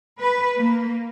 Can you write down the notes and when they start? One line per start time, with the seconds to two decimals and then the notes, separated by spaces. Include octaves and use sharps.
0.21 B4
0.58 A#3